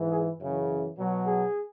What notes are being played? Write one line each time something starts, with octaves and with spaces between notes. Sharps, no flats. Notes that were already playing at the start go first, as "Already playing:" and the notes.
Already playing: G#2 E3
G#4
F#2 C#3 E3
B2 F#3
G#4